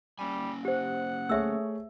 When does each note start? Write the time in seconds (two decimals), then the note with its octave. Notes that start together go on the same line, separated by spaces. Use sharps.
0.19 G3 A#3 C#4 G#5
0.65 G4 C5 F#5
1.29 A3 G#4 C#5 E5 E6